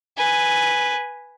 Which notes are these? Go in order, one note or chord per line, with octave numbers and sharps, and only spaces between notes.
B4 G#5